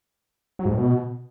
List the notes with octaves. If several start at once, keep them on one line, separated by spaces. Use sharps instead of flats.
F#3
G#2
A2
B2